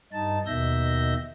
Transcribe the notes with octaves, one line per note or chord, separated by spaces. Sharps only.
G2 D#4 A5
D#2 B2 D#3 E5 G6 A#6